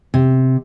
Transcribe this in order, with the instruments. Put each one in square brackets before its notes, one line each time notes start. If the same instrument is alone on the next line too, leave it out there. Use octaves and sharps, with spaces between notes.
[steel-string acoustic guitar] C3